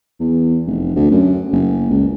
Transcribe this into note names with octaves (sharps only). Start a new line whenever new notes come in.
E2
F1
D2
F#2
F#1
C#2